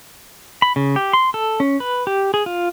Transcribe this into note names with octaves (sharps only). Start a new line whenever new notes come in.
B5
C#3
G4
C6
A4
C#4
B4
G4
G#4
F4